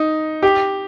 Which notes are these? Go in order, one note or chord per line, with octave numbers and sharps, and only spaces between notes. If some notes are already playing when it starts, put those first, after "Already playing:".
Already playing: D#4
G4